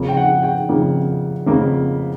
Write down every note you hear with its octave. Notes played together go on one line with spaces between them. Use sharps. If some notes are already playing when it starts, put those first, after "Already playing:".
Already playing: F2 C#3 F3 A#3
G5
F#5
G5
F2 C#3 F3 A#3
F2 C#3 F3 A#3